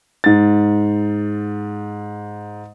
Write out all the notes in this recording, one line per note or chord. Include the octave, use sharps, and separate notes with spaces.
G#2 A6